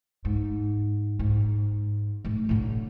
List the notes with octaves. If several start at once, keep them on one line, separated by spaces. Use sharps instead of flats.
G#2
G#2
A2 A3
A2 D3